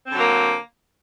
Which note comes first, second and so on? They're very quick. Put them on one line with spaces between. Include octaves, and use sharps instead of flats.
C4 D3 F#3 A#3